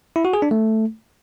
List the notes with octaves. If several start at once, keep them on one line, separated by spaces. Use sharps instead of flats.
E4
F#4
G#4
D4
A3